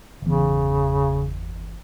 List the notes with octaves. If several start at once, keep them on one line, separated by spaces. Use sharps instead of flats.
G1 E2 C#3